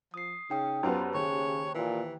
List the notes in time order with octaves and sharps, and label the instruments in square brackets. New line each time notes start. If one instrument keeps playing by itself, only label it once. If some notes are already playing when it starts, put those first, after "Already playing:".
[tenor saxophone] F3 [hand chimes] D#6 C7
[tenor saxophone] C#3 [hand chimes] D#4 G5 D#6
[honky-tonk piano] F#2 B3 [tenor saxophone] F4 [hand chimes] G4 C5 A5
[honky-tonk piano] D#2 [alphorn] C#3 [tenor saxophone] C#5
[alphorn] A#2 [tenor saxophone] E3